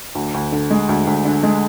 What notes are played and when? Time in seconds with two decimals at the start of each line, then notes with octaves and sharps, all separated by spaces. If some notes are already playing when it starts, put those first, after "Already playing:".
0.15 D2
0.34 D2
0.52 D3
0.70 G#3
0.89 D2
1.07 D2
1.25 D3
1.43 G#3